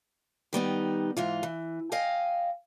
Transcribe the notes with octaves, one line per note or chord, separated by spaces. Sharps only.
D#3 G3 B3 D#4
G#2 E3 F4
E3
D#5 F5 G5 G#5